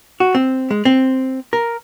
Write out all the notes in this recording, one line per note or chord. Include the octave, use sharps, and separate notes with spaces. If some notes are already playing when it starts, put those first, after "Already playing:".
F#4
C4
G#3
C4
A#4